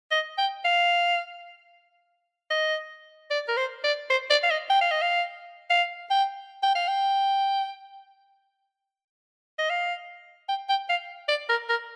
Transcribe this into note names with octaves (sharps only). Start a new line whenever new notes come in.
D#5
G5
F5
D#5
D5
A#4
C5
D5
C5
D5
F5
D#5
G5
F5
D#5
F5
F5
G5
G5
F5
G5
D#5
F5
G5
G5
F5
D5
A#4
A#4